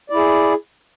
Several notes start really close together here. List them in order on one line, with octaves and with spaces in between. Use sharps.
D5 E4 G#4